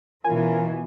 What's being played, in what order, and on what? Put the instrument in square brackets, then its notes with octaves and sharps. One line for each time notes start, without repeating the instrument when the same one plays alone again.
[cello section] B2 E3 [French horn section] C#4 F4 A#4 [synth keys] G#5